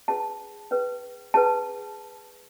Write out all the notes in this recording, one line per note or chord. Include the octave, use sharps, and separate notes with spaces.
C#4 G#4 B4 A5
C#4 G#4 B4
C#4 G#4 B4 A5